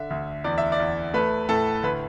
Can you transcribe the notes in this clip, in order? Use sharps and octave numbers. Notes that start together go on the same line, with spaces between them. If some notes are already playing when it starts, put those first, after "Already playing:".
Already playing: D3 E5
D2
E2 D5
E5
D5
E2
A3 B4
A2 A4
D2 B4